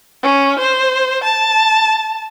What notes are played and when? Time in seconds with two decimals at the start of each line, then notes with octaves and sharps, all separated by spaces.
0.22 C#4
0.59 C5
1.24 A5